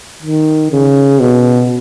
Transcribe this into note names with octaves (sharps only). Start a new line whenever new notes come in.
D#3
C#3
B2